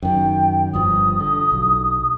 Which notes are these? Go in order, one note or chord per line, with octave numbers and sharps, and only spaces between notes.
F#2 D#3 G5
G1 G2 F3 D#6
D3
B1